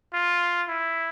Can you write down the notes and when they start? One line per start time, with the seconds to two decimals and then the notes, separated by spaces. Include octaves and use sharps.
0.13 F4
0.68 E4